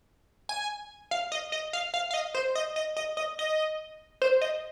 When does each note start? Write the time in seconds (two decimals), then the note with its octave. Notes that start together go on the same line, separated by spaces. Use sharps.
0.49 G#5
1.11 F5
1.32 D#5
1.52 D#5
1.73 F5
1.94 F5
2.11 F5
2.14 D#5
2.34 C5
2.55 D#5
2.76 D#5
2.97 D#5
3.17 D#5
3.39 D#5
4.22 C5
4.41 D#5